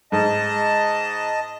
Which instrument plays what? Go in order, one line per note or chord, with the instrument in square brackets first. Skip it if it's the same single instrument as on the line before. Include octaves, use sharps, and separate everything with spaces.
[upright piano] G#2 [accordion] D#5 A5